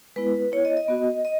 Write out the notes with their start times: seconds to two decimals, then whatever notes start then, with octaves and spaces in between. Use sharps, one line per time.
0.16 G#3 B3 E4 B4
0.52 B3 E4 C#5
0.65 D#5
0.77 D#5
0.88 B3 F#4
1.25 D#5